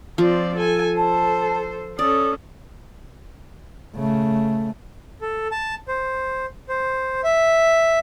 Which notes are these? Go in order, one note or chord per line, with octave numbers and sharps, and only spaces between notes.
F3 C4 D5
A4 G#5
A4 C5 A5
C#4 A4 D5 D#6
C#3 A3
A4
A5
C5
C5
E5